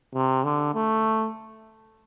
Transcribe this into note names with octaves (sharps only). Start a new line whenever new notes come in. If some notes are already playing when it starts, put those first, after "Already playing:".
C3
D3
A3